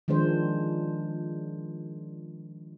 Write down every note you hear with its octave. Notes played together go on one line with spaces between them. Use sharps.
D#3 F3 G#3 D4 C5